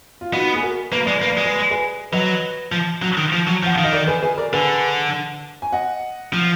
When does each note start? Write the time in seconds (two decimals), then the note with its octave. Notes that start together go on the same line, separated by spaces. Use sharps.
0.21 F4
0.33 B3 D#4 F#4
0.55 G#4
0.62 F#4 A#4
0.92 A#3 B4
1.05 G#3 D5
1.18 A#3 B4
1.32 D5
1.37 G#3
1.45 B4
1.58 D5
1.71 G#4 B4
2.12 F#3 B4 D#5
2.72 F3
3.02 F#3
3.17 D#3
3.33 F3
3.47 F#3
3.63 F3
3.66 F#5
3.75 D#3 F5
3.84 D#5
3.93 A#4 D5
4.07 G#4 B4
4.23 G#4 B4
4.38 A#4 D5
4.52 D3 G#4 B4
5.62 G#5
5.72 D#5 F#5
6.33 F3